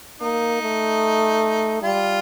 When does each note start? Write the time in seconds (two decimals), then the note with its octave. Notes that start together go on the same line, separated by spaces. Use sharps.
0.20 A#3 D#4
0.62 A3
1.83 G3 F4